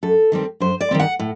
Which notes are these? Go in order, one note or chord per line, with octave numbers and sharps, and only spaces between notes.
F#2 A4
D#3 G3 C4
F#2 C5
D5
D#3 G3 C4
F#5
A2